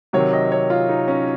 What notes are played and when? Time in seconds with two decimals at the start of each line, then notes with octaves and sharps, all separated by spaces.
0.13 C3 D#3 F#3 C#5
0.33 D#5
0.52 C#5
0.70 F4
0.89 D#4
1.08 C#4